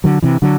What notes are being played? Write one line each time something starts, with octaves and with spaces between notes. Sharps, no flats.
D3 F#3
C3 E3
D3 F#3